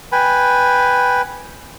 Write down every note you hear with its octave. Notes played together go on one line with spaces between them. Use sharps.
B4 G5 G#5 B5